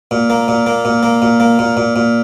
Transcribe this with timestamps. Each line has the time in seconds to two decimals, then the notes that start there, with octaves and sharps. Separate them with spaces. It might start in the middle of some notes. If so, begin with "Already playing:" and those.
0.11 A#2
0.30 A#3
0.48 A#2
0.66 A#3
0.85 A#2
1.03 A#3
1.22 A#2
1.40 A#3
1.59 A#2
1.77 A#2
1.96 A#2